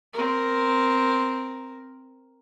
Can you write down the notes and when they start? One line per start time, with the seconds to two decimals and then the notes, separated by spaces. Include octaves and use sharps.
0.13 C4 A#4